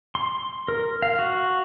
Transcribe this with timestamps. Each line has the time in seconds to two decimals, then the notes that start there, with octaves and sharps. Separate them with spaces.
0.15 C6
0.68 A#4
1.02 F5
1.19 F#4